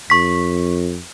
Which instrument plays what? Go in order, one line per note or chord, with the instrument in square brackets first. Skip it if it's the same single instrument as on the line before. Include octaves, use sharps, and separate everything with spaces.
[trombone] F2 [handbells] C#6 B6